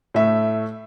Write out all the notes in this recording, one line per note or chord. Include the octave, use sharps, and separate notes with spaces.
A2 A3 E5